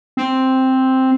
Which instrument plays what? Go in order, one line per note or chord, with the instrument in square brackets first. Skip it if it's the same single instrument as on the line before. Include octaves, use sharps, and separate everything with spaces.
[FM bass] C4